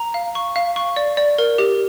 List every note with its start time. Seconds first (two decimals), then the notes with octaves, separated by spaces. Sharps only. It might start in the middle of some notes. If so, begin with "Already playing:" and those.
Already playing: A#5
0.14 F5
0.35 C#6
0.56 F5
0.76 C#6
0.96 D5
1.17 D5
1.38 A#4
1.58 G4